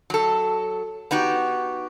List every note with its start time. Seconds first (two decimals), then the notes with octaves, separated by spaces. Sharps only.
0.10 F#3 A4
1.11 B3 D#4 F#4 G4